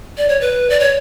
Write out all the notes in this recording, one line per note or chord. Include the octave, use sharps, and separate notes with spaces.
D5
C#5
B4
D5
C#5